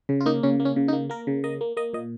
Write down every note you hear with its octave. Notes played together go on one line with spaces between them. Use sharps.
C#3
F4
A#3 D#4
C#3 C#4
A#3
C#4
C#3
D#4
A#3
A#3 A#4
C#3
A#3 D#5
A#3
A#3 D#5
A#2 D#5